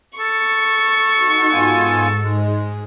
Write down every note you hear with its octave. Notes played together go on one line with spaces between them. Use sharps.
A4 C#6
D#4 F#4
G#2 B3 F4 G#5
G#3